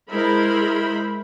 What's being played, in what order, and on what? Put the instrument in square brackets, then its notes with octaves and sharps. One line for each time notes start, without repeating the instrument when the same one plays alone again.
[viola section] G#3 E4 A#4 C5 B5